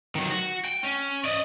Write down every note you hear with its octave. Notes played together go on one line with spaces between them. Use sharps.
D#3 F#3
F#4
G5
C#4
D5 D#5